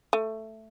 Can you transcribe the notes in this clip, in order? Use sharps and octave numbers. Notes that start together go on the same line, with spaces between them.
A3